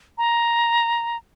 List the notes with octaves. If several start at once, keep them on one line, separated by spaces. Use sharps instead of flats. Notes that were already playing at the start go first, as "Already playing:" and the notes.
A#5